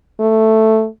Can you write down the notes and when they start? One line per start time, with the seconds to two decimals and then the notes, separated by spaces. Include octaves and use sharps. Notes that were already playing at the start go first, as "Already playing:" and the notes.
0.20 A3